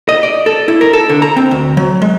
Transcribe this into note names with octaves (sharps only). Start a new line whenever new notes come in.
D#5
D5
A4
E4
A#4
A4
D3
A#5
C4
D2
F#3
G#3